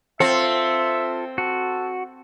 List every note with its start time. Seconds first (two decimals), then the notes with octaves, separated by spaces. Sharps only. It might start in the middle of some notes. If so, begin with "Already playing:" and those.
0.20 C4 F4 A4 E5
1.38 F#4 A4